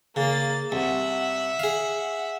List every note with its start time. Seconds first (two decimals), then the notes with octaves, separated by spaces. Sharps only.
0.16 C#3 A#3 A6
0.72 C2 E5 F#5
1.59 G#4 F5